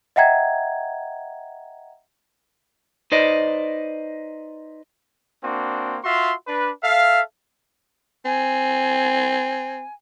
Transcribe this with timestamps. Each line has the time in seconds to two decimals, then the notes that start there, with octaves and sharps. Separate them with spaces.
0.16 D#5 E5 F#5 G5 A#5 G#6
3.12 D#4 B4 C5 D5 D#5
5.43 A#3 C4 D4 F#4
6.03 F4 F#4 E5 C6
6.47 D4 B4
6.82 A4 E5 F5
8.25 C4 G#5